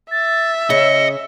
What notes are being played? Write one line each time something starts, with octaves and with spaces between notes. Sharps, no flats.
E5 A6
C#3 D#5 C#7